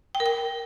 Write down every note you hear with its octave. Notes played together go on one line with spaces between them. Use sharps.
G5
A#4
G5